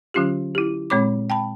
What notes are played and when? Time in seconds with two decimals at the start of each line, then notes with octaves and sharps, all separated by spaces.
0.14 D3 F#3 C#4 F4 G4
0.55 E4 G4
0.90 A#2 G#3 C4 C#5 B5 D6
1.30 G5 A5 B5